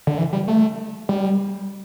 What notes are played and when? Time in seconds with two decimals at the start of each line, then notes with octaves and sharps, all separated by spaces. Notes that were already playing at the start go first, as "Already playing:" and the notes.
0.07 D3
0.18 E3
0.33 G3
0.48 A3
1.09 G3